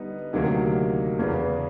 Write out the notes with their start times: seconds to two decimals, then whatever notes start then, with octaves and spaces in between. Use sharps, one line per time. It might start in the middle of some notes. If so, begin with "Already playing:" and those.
Already playing: D3 G3 B3 D#4
0.33 D2 C3 D#3 F#3 A#3
1.19 E2 C#3 E3